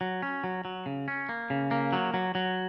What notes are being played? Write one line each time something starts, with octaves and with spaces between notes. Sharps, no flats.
F#3
C#4
F#3
F#3
C#3
C#4
A#3
C#3
A#3
F#3
F#3
F#3